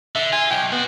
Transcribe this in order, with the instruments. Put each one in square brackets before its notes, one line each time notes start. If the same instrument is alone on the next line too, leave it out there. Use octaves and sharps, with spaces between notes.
[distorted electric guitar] D3 [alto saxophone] E5
[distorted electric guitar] F4 [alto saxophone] G#5
[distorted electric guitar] B1 [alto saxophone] G5
[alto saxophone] B3 [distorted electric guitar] C4 F#4